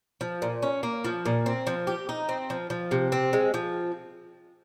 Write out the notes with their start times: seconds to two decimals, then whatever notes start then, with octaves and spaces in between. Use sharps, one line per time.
0.21 F3
0.42 A#2
0.62 C#4
0.83 A#3
1.05 F3
1.26 A#2
1.46 C4
1.67 F3
1.87 G4
2.09 D#4
2.29 C4
2.50 F3
2.70 F3
2.91 C3
3.12 C4
3.33 G#3
3.54 F3